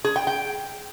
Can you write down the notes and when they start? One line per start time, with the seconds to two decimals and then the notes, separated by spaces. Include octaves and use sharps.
0.04 G#4
0.16 G5
0.27 G5